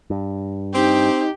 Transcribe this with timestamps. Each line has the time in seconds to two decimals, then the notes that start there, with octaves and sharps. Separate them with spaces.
0.10 G2
0.74 C4 D#4 G4